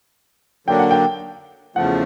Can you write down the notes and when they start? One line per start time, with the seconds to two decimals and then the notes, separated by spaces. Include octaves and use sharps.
0.67 D3 F#3 A#3 D4 G5
0.79 F#5
0.91 G5
1.76 E2 C#3 F3 A3 F#5